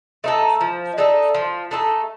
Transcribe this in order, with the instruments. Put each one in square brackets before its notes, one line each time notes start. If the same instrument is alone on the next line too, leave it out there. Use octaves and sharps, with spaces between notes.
[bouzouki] A3 D#4 A4 [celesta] D#5
[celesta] A#5
[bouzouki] F3
[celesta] D#5
[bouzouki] A3 D#4 A4 [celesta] D5
[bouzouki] F3
A3 D#4 A4